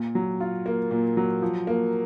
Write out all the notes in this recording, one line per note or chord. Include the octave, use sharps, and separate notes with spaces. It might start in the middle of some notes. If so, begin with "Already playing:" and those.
Already playing: A#2
F#3
F4
A#3
A#2
F#3
F3
A#3